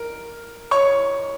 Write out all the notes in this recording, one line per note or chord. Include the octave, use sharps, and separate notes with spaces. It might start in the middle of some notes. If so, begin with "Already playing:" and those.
Already playing: A#4
C#5 C#6